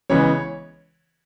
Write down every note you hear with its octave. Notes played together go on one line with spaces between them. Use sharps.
C#3 E3 G#3 B3 C#5